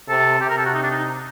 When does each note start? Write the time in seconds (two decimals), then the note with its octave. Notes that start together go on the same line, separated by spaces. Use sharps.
0.09 C3 A4
0.41 C3 G4
0.49 A#4
0.58 A4
0.66 F#4
0.74 D#4
0.83 D4
0.91 D#4